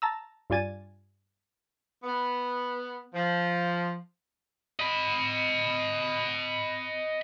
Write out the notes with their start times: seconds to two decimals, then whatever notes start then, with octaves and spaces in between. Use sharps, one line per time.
0.02 A5 A#5 E6
0.50 G2 F4 D5 G#5 A6 D#7
2.04 B3
3.14 F3
4.79 D#5 B5